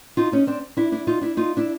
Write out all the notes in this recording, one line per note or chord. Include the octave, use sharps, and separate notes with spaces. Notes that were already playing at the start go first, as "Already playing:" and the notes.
D#4 F4
C#4 D#4
C4 D4
D4 E4
D4 E4
D#4 F4
D4 E4
D#4 F4
D4 E4